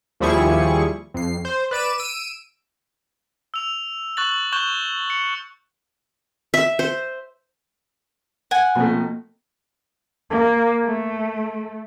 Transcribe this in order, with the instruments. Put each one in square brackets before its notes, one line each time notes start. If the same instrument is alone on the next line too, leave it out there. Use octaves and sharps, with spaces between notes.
[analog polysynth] D#2 F3 G3 E4 G#4 C#6
F2 C7
C5
B4 D5 D7 E7
E6 D7 D#7
[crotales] E6 F7
C#6 F#6 A6 F#7
C#6 F#6 G6 E7 G7
C#7
[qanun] E5
C5
[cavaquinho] F#5 G#5
[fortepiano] B2 F3 A3 [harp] A#3 C4 D#5
[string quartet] A#3
A3